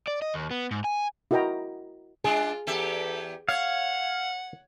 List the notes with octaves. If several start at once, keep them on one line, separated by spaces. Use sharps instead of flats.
D5
D#5
D#2
B3
G#2
G#5
E4 F#4 A#4 D#5 G5 A#5
G#3 D4 F4 G#4
E2 G4 A4 E5
C#5 F5 F#5